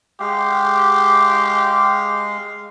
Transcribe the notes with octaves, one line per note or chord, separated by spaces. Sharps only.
G#3 G4 F5